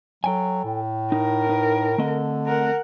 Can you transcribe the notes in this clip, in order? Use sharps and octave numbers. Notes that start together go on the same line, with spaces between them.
F#3 A4 G5 G#5
A2
D#4 A#4
D#4 B4
D3 A3 C4 D#5
A#4 F#5